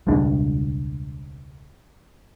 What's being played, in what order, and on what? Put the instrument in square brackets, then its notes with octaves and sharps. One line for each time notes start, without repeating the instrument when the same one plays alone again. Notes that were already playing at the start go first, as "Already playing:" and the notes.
[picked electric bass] E1 C#2 G3 D4